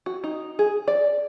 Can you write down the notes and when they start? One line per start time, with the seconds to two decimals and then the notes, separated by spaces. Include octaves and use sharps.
0.06 F#4
0.24 D#4
0.59 G#4
0.88 D5